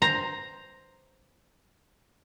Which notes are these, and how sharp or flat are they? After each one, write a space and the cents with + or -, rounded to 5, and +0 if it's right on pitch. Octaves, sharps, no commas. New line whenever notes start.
C5 +5 A#5 +0